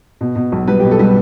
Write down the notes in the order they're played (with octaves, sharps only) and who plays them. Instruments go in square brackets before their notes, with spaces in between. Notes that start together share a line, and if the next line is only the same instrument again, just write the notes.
[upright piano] B2
B2
B1
G3 B4
B2 G4
A4
G3 B4